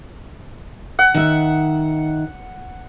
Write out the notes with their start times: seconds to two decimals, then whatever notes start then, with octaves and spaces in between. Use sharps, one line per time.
0.99 F#5
1.14 D#3 E5